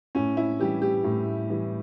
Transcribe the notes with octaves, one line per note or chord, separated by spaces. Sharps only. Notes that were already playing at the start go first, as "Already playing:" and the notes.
A2 C#4
E4
E3 G3 G4
G4
A2
E3 G3